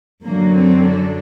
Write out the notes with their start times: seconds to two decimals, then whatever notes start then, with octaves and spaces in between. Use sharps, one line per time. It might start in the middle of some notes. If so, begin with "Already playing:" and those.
0.23 F#2 D3 F#3 A#3
0.56 C4
0.89 D4